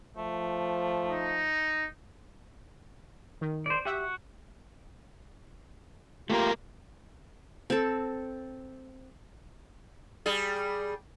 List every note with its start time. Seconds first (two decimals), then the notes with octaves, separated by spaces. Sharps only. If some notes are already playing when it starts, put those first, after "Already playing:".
0.17 F3 A3
1.08 D#4
3.41 D#3
3.66 C5 D5
3.85 F#4 G4 E5 F#5
6.30 A3 A#3 F4 G4 A#4
7.70 C4 A4
10.26 G3 G#4